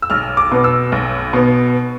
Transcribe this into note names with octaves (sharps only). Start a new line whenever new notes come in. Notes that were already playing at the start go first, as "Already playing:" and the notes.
E6
B1 F6
D6
B2 B3
E6
B1
B2 B3